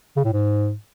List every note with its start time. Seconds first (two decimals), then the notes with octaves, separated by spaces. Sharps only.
0.16 C#3
0.25 A2
0.33 G#2